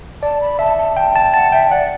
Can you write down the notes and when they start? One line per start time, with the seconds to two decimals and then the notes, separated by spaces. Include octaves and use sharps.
0.22 D5 A5
0.41 B5
0.59 E5 A5
0.78 A5
0.97 G5 A5
1.16 A5
1.34 F#5 A5
1.52 E5 G5
1.70 D5 F#5